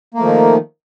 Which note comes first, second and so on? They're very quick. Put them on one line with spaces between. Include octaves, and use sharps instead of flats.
A#3 A3 F3 D#3